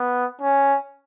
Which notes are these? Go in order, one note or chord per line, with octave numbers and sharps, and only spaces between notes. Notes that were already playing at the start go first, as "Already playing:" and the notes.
Already playing: B3
C#4